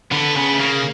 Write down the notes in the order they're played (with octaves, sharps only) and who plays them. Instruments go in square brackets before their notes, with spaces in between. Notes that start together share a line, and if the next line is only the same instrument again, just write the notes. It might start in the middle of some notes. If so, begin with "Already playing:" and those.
[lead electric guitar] D3 [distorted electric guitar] B3
[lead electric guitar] C#3 [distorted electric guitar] B3
[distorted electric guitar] A3
[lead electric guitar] C#3 [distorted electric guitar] A#3